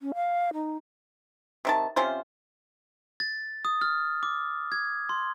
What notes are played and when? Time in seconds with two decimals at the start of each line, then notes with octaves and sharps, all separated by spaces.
0.01 C#4
0.15 F5
0.54 D#4
1.65 C3 D#3 A5
1.96 C3 C#4 F4 C5
3.20 A6
3.65 D#6
3.81 F6
4.23 D6
4.72 G#6
5.09 C6